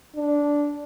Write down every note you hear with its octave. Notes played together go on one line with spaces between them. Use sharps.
D4